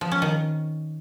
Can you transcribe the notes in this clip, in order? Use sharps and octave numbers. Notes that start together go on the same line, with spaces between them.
F3
C#4
D#3